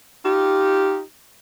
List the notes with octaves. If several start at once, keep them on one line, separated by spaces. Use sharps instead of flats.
D#4 F4 G4